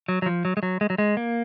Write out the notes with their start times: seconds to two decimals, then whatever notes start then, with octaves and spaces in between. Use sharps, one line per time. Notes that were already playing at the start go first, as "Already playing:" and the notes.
0.08 F#3
0.22 F#3
0.26 F3
0.45 F#3
0.57 G#3
0.63 F#3
0.81 G#3
0.90 F#3
0.98 G#3
1.17 A#3